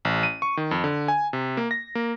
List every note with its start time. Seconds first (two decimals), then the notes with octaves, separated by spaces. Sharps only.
0.05 A1
0.23 D#7
0.42 C#6
0.57 D#3
0.71 F2
0.84 D3
1.08 G#5
1.33 C3
1.57 A#3
1.71 A#6
1.95 A#3